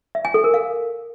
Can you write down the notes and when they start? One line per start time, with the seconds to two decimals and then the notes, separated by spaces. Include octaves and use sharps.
0.15 E5
0.25 G#5
0.34 A4
0.44 A#4
0.54 F5